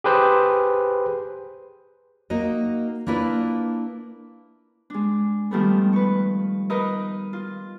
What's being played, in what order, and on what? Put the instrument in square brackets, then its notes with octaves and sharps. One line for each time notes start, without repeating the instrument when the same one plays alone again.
[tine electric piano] G4 G#4 B4 C5
[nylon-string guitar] A#3 D#4 F#4 D#5
A#3 D4 E4 F4 B4
[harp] G#3 D4
D#3 F3 G3 A3 B3
B4 C#6
D#4 A#4 B4 D#5
F4